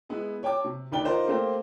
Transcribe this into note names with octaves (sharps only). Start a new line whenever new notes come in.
G#3 B3 E4
C#5 G5 A5 D6
C3
D2 D#3 B4 D5 G5 G7
D#4 F4 A#4 C5 D5
A3 A#3 C4 G4 C5 F5